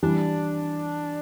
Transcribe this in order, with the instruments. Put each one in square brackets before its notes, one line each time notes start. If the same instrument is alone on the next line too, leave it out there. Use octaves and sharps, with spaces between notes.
[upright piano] E3 G3 [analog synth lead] D4